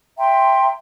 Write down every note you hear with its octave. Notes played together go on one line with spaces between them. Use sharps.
E5 G5 A#5 C6